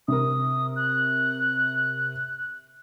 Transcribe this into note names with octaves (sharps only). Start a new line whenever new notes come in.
C3 A#4 D#6
F#6